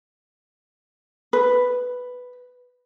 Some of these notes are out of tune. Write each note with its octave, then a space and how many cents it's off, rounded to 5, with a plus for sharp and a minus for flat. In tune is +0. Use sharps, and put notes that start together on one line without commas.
B4 +5